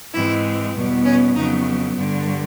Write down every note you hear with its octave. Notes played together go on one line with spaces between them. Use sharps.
G#2 E3 G#3 C4 E4
E2 B2 G3 B3
C#4
F2 C#3 F#3 B3 D#4
G2 D3 G3